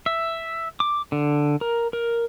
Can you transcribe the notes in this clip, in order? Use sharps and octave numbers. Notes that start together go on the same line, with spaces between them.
E5
D6
D3
A#4
A#4